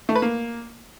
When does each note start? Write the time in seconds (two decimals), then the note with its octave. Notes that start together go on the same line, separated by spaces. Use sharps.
0.09 A3
0.15 B4
0.22 A#3